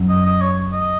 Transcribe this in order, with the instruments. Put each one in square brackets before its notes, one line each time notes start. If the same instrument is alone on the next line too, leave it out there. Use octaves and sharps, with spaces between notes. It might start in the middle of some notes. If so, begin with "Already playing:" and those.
Already playing: [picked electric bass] F#2
[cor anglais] D#5
D#5
C#5
D#5